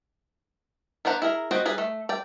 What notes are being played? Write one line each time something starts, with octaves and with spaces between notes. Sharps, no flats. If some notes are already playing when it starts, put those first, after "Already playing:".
B3 D4 C5 F#5 A#5
E4 G#4 A#4
B3 C4 F#4 D#5 G5
G3 G#4 B4
A3
D5 G5